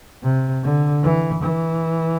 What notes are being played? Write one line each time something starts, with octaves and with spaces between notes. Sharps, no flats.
C3
D3
E3
E3